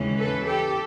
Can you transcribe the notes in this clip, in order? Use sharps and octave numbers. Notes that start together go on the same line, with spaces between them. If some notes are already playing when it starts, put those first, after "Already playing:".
Already playing: D#2 C#3 E3 G#3 C#4
A4 B4
G4 A4